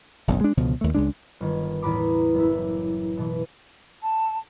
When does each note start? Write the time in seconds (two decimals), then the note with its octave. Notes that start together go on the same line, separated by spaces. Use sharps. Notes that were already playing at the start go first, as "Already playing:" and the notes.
0.27 F#1 B1 E2 G2
0.41 G#3 D4
0.57 C#2 B2 D3 F3
0.81 D#2 A3
0.95 C#2 G#3 D4
1.41 G1 D#3
1.82 E2 A2 B4 A#5 B5 D6
2.34 F#1 E4
3.17 B2 E3
4.02 A5